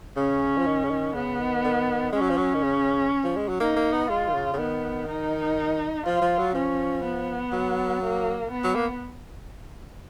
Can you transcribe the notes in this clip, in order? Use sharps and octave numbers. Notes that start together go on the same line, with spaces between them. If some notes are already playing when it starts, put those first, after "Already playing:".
C#3 C#4
F3
D#3
C#3
D#3
C#3 B3
D#3
D#3
G#3 C#4
F#3
F3
F#3
D#3
C#3
F3
G#3
F#3
A#3 D#4
A#3
B3
G#3 F4
D#3
C#3
C#3
D#3 B3
D#4
F3 F4
F3
F#3
F3 C#4
B3
F#3
A#3
B3
F#3
A#3